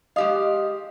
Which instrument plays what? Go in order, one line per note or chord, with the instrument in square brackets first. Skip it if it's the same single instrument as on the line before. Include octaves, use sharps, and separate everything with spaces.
[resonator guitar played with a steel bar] G#3 G4 F5 [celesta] D#5 D#6